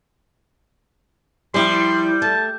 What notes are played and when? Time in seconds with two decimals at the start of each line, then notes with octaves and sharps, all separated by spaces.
1.54 F3 G3 E4 C6
2.22 A3 A5